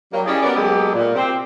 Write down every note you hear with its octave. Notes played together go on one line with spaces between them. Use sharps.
F#3 G3 A#3
C#4 E4 G4 G#4 D5 D#5
B3 C#4 F#4 A#4 D5
F#3 G#3 A#3 B3 G4 A4
A#2
C4 G4